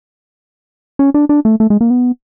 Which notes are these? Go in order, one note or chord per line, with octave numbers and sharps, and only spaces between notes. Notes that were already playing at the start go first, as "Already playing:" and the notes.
C#4
D4
D4
A3
A3
G#3
A#3
B3